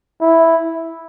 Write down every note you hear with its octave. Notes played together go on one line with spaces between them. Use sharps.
E4